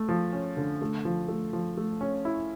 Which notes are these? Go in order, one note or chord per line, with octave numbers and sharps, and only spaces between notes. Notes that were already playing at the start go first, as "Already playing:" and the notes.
Already playing: A3
F3
C#4
D3
A3
F3
A3
F3
A3
C#4
E4